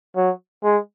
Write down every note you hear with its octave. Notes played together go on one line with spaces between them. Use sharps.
F#3
G#3